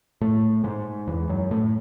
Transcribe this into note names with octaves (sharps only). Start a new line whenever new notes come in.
A2 A3
G#2 G#3
E2 E3
F#2 F#3
A2 A3